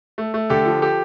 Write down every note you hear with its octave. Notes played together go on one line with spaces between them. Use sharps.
A3
A3
D3 G4 A4
F3
G4 A4